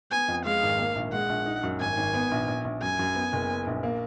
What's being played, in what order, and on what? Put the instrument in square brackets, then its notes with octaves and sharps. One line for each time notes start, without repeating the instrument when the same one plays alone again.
[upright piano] B3 [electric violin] G#5
[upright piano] F2
[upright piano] G#3 [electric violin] F5
[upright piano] G#1
A#3
A#1
[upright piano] G#3 [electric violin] F#5
[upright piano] A#1
D#4
F#2
[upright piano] G#1 [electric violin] G#5
[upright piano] G#1
B3
A#1
A#1
A#1
[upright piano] F#2 [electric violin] G#5
[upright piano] F#2
B3
F#1
B3
A#1
A#3